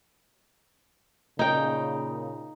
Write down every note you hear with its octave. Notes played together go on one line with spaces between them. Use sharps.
A#2 C#3 D#4 G5